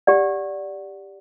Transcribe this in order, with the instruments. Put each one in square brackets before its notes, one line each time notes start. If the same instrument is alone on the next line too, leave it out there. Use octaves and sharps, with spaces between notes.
[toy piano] G4 D5 F#5